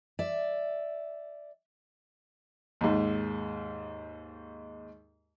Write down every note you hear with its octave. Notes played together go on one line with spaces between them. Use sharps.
D5 E5
D#2 G#2